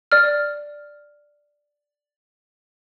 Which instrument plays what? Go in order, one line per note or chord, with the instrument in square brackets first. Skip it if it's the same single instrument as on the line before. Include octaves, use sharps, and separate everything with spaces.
[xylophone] D5 F6